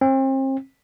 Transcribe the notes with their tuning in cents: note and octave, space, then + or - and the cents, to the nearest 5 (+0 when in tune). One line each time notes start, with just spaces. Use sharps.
C4 +35